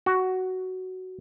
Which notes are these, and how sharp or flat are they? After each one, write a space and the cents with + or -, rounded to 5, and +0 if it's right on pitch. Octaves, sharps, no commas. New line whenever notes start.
F#4 +10